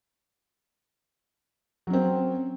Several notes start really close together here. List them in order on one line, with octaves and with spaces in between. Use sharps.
F#3 C#4 C4